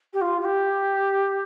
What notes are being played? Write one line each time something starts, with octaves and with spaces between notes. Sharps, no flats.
G4
F4
F4
G4